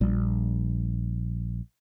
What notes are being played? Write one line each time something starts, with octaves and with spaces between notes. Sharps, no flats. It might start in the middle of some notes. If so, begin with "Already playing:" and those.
A#1 G3